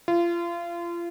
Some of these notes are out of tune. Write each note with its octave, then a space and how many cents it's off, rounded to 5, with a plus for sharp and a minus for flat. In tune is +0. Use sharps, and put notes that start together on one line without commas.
F4 -30